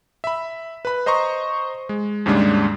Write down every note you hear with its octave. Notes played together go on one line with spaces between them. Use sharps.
E5 B5
B4 B5
C5 D#5 A#5 C6 C#6
G#3
D#2 G#2 C#3 G3 G#3 D4